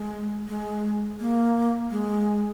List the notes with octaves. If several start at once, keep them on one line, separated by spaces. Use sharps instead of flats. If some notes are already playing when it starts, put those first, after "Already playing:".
Already playing: G#3
G#3
A#3
G#3